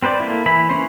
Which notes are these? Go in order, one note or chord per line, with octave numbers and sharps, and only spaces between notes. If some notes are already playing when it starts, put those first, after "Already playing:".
C4 B4 C5 D5
A3 A#3 E4
E3 E4 B5
E3 A#3 C#4 C5